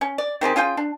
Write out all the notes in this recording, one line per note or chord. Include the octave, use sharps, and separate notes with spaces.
C#4
D5
D#3 C4 G4 G#4
C#4 F4 G#4 G5
D4